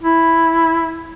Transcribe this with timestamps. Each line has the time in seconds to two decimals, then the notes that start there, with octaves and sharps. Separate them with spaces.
0.03 E4